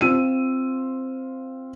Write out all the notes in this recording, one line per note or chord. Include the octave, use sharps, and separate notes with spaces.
C4 F4 E6 D#7